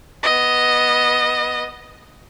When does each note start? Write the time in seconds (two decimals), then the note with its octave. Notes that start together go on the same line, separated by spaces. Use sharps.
0.23 B3 D#5